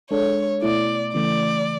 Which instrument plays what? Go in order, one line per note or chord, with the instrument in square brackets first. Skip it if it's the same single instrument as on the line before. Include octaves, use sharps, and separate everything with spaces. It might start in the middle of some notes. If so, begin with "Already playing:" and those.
[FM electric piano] G#3 D4 A4 [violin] C#5
[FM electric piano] B2 A3 E4 [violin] D5
[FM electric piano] C#3 E3 A3 [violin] D5